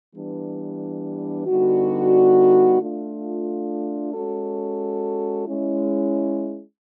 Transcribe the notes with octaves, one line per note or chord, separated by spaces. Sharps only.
E3 G3 B3 D4
D3 G3 B3 D#4 F#4
A3 D4 F4
G#3 C#4 F#4 A4
G#3 C#4 E4